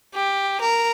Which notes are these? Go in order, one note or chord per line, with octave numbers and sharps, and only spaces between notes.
G4
A#4